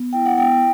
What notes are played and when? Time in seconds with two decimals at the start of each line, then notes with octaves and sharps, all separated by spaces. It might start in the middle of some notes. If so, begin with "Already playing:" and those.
Already playing: B3
0.13 E4 G5
0.26 F#5
0.37 B3 G5